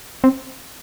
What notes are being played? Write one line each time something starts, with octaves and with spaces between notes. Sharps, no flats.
C4